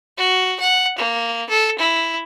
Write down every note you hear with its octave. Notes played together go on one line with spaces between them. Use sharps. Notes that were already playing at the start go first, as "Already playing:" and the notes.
F#4
F#5
A#3
A4
E4